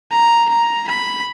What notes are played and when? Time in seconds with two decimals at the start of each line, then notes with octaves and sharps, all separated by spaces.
0.12 A#5
0.50 A#5
0.88 B5